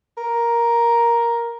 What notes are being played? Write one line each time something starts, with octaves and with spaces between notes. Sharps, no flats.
A#4